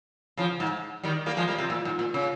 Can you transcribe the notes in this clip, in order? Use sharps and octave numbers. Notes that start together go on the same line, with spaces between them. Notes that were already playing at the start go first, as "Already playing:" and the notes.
C#3 F3
G#2
D#3 G3
G3 A#3
F3 G#3
G3 A#3
C3
A#2
G#2
A#2
C#3